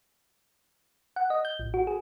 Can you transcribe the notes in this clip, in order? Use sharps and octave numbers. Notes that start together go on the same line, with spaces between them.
F#5
D#5
G6
A1
F#4
G#4